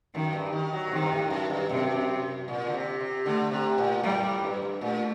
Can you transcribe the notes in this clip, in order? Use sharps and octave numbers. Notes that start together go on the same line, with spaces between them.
F#2 D#3
G2
D#3
F#3
A#2
C3 D#3
G2
A2
F#2
G2
F#2 C3
A#2
D3
C3
C3
D3 A3
C3
A#2
A2 G3
A#2
A2
G2
G2
A#2 A3